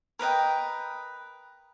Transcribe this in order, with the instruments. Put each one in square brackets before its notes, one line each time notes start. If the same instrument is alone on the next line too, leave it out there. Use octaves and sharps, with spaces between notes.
[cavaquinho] A#4 B4 D#5 G5